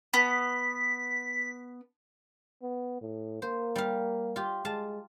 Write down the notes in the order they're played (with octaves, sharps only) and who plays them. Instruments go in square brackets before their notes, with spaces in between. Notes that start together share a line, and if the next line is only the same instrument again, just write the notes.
[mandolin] B3 [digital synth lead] B6
[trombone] B3
A2
[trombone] A#3 [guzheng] C5
[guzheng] G3 F5
F4 G4
[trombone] G#3 [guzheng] F4 F5 A5